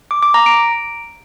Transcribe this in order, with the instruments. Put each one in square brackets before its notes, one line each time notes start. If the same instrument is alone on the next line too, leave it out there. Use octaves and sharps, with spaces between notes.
[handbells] D6
D6
A#5
D7